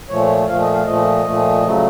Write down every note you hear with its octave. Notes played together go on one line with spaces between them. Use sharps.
A#2 F3 A3 C#5
A#2 F3 A3 F5
D#5
F5
A#2 F3 A3 D#5
A#2 F3 A3
C#3 F#3 A3